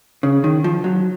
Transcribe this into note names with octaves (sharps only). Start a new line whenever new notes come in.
C#3
D#3
F3
F#3